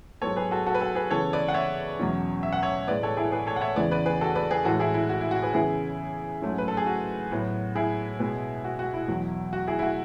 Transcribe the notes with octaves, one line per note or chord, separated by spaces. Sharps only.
G#2 F#3 B3 A4 C#5
G#4 B4
F#4 A4
F#4 A4
B4
F#4 A4
G#4 B4
C#3 E3 B3 A4 C#5
B4 D5
F#5
C#5 E5
E2 B2 F#3 C#4
E5
F#5
C#5 E5
A2 G#3 B3 B4 D5
A4 C#5
E4 G#4
G#4 B4
A4 C#5
F#5
C#5 E5
E2 C#3 E3 B3 B4 D5
B4 D5
G#4 B4
F#4 A4
B4 D5
G#4 B4
A2 E3 G#3 F#4 A4
E4 G#4
E4
F#4
E4
F#4
G#4 B4
C#3 E3 B3 E4 G#4
G#2 F#3 A3 C#4
B4
A4
G#4
F#4
A2 F#3 B3
E4 G#4
B2 G#3 B3
F#4
F#4
E4
E2 B2 F#3
F#4
E4 G#4
E4
F#4